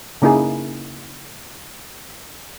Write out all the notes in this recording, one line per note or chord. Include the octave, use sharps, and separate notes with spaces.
C#3 A#3 D#4 E4 G#4